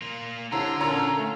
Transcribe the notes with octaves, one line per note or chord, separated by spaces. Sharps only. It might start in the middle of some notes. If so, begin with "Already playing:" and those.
A#3 F4
C2 D3 E4 F4 C#5 A#5
A#2 C#4 C#5 A#5 E6
A3